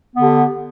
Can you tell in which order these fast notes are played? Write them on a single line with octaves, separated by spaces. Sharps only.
B3 D3 G4